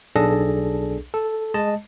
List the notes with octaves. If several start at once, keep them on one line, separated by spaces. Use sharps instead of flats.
B1 D4 G#4 A4 A#6
A4
G#3 D#5 A5